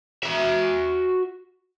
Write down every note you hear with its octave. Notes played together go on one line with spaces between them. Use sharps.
F#4 E5